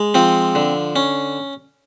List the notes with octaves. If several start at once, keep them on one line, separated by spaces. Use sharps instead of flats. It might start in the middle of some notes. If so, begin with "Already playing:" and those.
Already playing: G#3
F3 C4
D3
C#4